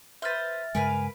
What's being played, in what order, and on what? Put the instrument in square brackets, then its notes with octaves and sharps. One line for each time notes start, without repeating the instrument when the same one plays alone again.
[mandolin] B4 C5 [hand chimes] E5 F6 A6
[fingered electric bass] G2 C#3 G#3 [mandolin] A#4 B4 F5 [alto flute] G#5